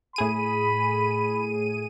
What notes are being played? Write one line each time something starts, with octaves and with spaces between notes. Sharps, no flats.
A2 G#4 B5 D#7